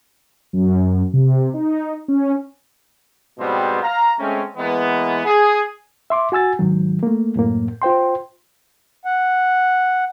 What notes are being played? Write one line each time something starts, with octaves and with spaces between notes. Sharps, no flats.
F#2
C3
D#4
C#4
G#2 B2 F3 G3 B3 C4
F5 A#5
G#3 A3 C4 C#4
E3 G#3 A#3 B3
G#4
E5 C6 D6
F#4 G#5 E6 A6
G#2 D#3 F#3
A3 A#3
F#2 A2 A#3
F4 C5 G5 C6
F#5